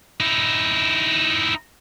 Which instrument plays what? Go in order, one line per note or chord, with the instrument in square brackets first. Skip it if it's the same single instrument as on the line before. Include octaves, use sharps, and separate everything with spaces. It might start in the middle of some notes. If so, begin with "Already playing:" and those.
[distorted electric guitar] D#4 E4